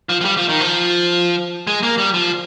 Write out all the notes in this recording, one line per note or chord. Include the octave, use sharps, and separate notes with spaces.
F3
F3
G3
F3
D#3
F3
G#3
A#3
G3
F3